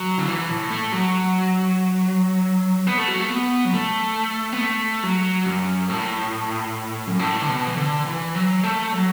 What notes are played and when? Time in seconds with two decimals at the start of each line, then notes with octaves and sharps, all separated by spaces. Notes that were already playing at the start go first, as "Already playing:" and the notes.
Already playing: F#3
0.18 D3
0.28 E3
0.50 A2
0.71 A3
0.92 F#3
2.87 B3
2.98 A3
3.08 F#3
3.20 A3
3.30 B3
3.65 F#3
3.74 A3
4.53 B3
4.60 A3
5.03 F#3
5.46 F#2
5.90 A2
7.07 F#2
7.19 A2
7.41 D3
7.48 B2
7.67 E3
7.77 D3
8.05 E3
8.35 F#3
8.64 A3
8.92 F#3